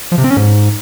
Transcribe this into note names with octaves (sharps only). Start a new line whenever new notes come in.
F3
C3
C4
C#4
G#2